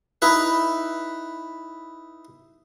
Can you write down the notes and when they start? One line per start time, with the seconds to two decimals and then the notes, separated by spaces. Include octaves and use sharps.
0.22 D#4 E4 B4